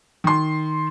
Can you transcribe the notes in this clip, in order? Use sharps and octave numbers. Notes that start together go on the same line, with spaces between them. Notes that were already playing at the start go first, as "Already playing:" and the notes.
D#3 C6